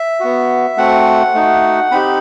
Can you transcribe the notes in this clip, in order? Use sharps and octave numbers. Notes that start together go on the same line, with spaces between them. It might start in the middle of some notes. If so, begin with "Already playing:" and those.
Already playing: E5
B3 F#4
A3 C4 F#4 F#5
A3 D#4 F#4
C4 D#4 G4 B5